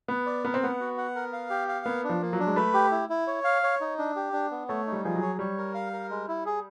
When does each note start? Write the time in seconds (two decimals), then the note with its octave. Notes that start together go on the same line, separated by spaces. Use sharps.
0.08 B3 B4
0.26 D5
0.44 B3 A#4
0.54 C4
0.63 B3 F#5
0.80 F#4
0.98 F#5
1.15 A#4
1.33 F5
1.50 G4
1.68 F5
1.86 A#3 B3
2.04 D4
2.09 F3
2.21 A#3
2.33 F#3
2.39 D4
2.46 G#3
2.56 A3 B4
2.74 G4
2.91 E4
3.09 E4
3.27 C#5
3.44 F5
3.63 C#5
3.81 D#4
3.98 D4
4.16 G4
4.33 D4
4.51 B3
4.68 A3 C#5
4.87 D#4
4.92 G3
5.04 F3 G#4
5.16 F#3
5.22 C#5
5.39 G3 C#5
5.58 A#4
5.74 F5
5.93 A#4
6.10 G#3
6.28 E4
6.46 G#4